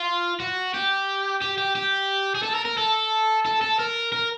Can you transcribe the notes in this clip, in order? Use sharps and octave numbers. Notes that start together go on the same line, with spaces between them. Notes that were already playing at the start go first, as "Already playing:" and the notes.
Already playing: F4
F#4
G4
G4
G4
G4
G#4
A4
A#4
A#4
A4
A4
A4
A#4
A#4